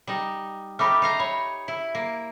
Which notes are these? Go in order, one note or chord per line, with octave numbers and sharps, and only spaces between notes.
G3 D#4
A3 D#4 G4 B5 D6 F6
D#4 F5 A#5
C#5 B5
E4
A#3